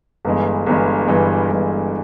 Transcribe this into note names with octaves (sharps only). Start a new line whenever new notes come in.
G1 G2 E3 G#3
G1 G2 E3 G#3
G1 G2 E3 G#3
G1 G2 E3 G#3